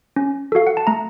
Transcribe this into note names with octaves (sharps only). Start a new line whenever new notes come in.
C#4
F#4 A4 F5
F#5
A5
A3 A#5